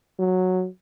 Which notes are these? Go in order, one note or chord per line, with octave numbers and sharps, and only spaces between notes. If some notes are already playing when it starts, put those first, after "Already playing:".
F#3